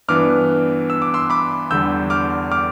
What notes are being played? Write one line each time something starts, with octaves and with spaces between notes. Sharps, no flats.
G2 E3 B3 D4 D6 F6
E6
D6
C6 E6
B5 D6
E2 D3 G3 E6 G6
D6 F6
D6 F6